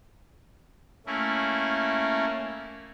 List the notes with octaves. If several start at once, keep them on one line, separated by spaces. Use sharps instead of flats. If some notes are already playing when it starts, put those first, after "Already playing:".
A3 A#3 C#4 E4